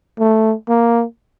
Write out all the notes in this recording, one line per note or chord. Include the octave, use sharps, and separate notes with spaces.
A3
A#3